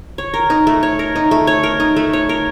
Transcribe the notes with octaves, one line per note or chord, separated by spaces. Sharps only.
C#5
A#4
D#4
A3
C#5
A#4
D#4
A3
C#5
A#4
D#4
A3
C#5
A#4